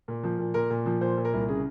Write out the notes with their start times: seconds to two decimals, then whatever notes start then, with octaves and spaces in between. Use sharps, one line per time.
0.08 A#2
0.24 F3
0.39 A#2
0.54 A#2 A#4
0.70 A#2
0.86 F3
1.01 A#2 C5
1.17 A#2
1.25 A#4
1.33 C2
1.48 C#3 G#4